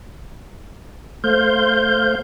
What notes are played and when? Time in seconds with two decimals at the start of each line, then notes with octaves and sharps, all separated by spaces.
1.24 A3 C5 F5 G6